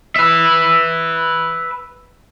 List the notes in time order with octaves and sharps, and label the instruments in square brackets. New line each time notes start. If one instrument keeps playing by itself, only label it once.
[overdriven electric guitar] B4 E5